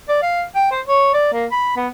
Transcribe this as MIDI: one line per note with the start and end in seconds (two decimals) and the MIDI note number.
0.09 0.21 74
0.22 0.44 77
0.55 0.69 79
0.71 0.81 72
0.87 1.10 73
1.14 1.30 74
1.33 1.46 58
1.51 1.75 83
1.76 1.87 59